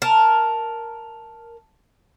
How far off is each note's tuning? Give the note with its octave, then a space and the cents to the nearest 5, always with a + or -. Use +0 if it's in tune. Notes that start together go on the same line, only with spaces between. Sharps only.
A#4 +0 A5 +0